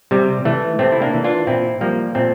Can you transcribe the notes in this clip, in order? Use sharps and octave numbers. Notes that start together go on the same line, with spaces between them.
C3 G3
E3 A3
C3 A3 C4
E4
A#3 D4
E3
D4 F4
A#2 C4 E4
F3 G3 A#3
A#2 A3 C4